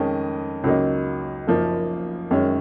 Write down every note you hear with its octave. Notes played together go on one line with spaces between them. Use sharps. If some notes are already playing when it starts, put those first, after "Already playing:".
Already playing: F2 D#3 G#3 C#4 D#5
C#2 C#3 F#3 A#3 D#4
F#1 F#2 F3 A#3 D#4
F#2 D#3 G#3 C#4